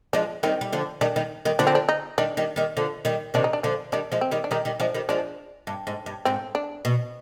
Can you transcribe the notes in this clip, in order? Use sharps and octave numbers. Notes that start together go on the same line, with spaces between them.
F3 G#3 D4
D#3 G3 C4
G3
D3 F3
D#3 G3 D4
D#3 G3
D#3 G3
D3 F3 D4
C4
D4
D#4
D#3 G3 D4
D#3 G3
D#3 G3
D3 F3
D#3 G3
C3 D#3 D4
D#4
D4
D3 F3 D4
D#3 G3 D4
F3 G#3
C4
D#3 G3
D4
D#3 G3 D#4
D#3 G3
F3 G#3 D4
D#3 G3
F3 G#3 D4
G2
G#2
G2
G#2 C4
D4
B2